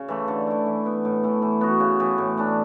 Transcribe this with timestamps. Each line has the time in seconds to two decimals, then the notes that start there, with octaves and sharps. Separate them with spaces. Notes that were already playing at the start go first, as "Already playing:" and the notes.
Already playing: C#3
0.08 E3 A3
0.28 D3
0.47 A3 E4
0.66 E3
0.85 B3 E4
1.05 A2
1.23 E3 A3 E4
1.42 E3
1.61 B3 F#4
1.80 C#3
2.00 E3 B3
2.18 A2
2.37 E3 A3 D4